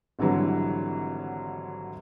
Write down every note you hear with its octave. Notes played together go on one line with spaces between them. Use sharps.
G#1 D3 E3 F#3 G3